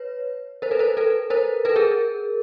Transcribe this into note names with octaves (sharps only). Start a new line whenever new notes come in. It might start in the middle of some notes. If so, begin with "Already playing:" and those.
Already playing: B4 C#5
A#4 C5
A4 B4
A#4 C5
A4 B4
A#4 C5
A4 B4
G#4 A#4